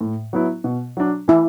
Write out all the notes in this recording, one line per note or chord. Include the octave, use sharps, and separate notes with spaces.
A2
F#3 B3 E4
B2
F#3 D4
E3 E4